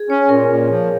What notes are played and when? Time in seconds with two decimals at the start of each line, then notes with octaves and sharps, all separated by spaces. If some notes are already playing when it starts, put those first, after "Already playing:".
Already playing: G#4
0.10 C#4 C#5
0.28 A#2 A#4
0.49 A#2
0.69 F3